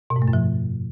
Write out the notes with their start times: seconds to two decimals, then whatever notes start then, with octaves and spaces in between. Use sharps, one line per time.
0.10 B2
0.16 G#2
0.22 A3
0.28 F#2
0.33 F3